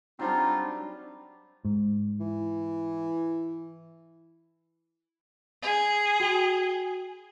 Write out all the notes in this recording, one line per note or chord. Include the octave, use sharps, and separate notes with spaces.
F#3 G3 C4 D4 D#4 F4
G#2
E3
G#4
F#4 G5 G7